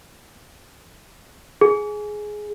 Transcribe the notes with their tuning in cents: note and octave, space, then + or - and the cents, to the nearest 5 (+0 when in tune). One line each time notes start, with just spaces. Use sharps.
G#4 +10